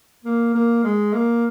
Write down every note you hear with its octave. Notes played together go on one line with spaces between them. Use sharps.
A#3
A#3
G#3
A#3